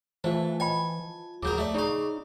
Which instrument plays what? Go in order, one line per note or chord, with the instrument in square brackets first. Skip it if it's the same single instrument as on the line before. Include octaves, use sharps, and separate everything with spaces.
[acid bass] E3 [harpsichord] A3 [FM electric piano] F4 A5 [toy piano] C5
[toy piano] D#5 G5 B5 [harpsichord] G#5
[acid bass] D#2 [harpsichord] C#3 F#3 A#4 [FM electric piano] D6 G6
[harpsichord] A3 D5 [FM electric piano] D6
[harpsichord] C#3 F5 [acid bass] D#4 [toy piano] D5 C#6